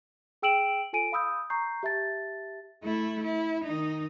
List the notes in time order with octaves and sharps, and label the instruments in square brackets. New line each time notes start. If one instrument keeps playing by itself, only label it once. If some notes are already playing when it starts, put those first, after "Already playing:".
[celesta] G#4 G5 E6 D7 E7 F#7
F4 A4 G#5 D7 D#7
F5 B5 D#6 E6 G6
A#5 C#6 G6 C7
G4 E5 A5 A6
[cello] A3 E4
E4
D#3 D#4